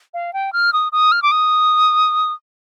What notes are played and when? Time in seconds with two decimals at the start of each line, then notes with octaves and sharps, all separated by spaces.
0.14 F5
0.33 G5
0.53 F6
0.73 D#6
0.92 D#6
1.12 F6
1.22 D6
1.31 D#6